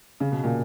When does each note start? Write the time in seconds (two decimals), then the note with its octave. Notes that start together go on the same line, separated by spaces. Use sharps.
0.20 C#3
0.32 B2
0.44 A#2